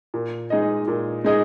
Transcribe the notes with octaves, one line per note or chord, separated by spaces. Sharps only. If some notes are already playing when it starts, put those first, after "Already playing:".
A#2
G#3 D#4 G#4 D#5
A#2
G#3 D#4 G#4 D#5